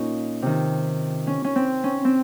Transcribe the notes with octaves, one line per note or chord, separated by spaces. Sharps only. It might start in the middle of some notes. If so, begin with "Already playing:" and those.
Already playing: A#2 C#4 D#4 F4
C3 D#3
C#4
C#4
C4
C#4
C4